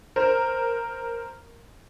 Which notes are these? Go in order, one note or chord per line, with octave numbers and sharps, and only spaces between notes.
A#4 C5